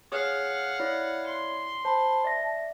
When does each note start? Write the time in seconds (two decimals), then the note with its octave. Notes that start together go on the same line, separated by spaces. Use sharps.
0.12 G#4 C#5 F5 F#5 D#6
0.80 E4 C#5 D5
1.27 C6
1.85 C5 A5 B5
2.24 D5 E5 A#6